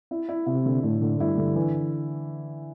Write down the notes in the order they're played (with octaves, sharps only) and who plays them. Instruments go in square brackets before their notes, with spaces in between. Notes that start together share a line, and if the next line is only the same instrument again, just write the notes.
[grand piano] E4
E4
[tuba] C3 [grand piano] E4
[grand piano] D3
[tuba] A2 [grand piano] A3
[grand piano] D3
[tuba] G2 [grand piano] E4
[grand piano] D3
E3